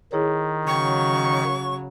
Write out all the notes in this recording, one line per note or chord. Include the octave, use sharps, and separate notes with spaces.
D#3 E4 G#4 C#5
C#3 F#3 G5 C#6